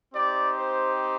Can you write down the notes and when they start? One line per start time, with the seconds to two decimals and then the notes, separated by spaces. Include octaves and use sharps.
0.13 C4 D#4 G4 D5
0.55 C5